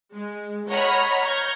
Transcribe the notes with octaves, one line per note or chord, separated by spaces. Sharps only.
G#3
C#5 D#5 F#5 A#5 B5 F6
A#5 C#6 F6 G6 G#6